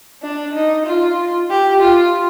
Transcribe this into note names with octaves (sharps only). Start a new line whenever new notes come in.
D4
D#4
F4
G4
F4